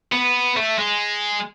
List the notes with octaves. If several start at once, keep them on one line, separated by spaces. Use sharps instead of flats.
B3
A3
G#3